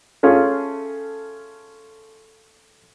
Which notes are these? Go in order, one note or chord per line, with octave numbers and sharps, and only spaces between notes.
A3 C#4 F4 G#4